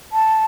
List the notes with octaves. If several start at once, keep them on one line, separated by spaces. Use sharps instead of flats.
A5